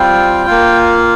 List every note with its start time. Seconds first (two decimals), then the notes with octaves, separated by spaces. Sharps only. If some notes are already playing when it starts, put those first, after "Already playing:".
Already playing: G3 C4 F4 G5
0.47 A#3 F4